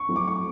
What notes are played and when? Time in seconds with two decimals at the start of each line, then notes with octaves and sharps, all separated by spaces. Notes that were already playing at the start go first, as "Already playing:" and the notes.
Already playing: C#6
0.09 F#3 A3 C4 E4
0.16 D6
0.28 C#6